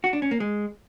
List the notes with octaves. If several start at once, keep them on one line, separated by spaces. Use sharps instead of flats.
F#4
D4
C#4
A#3
G#3